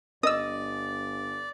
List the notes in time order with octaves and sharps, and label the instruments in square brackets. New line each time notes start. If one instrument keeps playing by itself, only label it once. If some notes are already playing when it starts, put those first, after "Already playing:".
[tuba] G1 [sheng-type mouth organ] D5 [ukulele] D#5 [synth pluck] D#6 E6